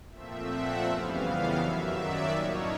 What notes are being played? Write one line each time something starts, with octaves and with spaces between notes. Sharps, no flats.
A#2 F3 A3 C4 E5
F#5
F2 C#3 E3 G3 B3 F5
F#2 D#3 F#3 E5
D5
A2 F3 A#3 D#4 C#5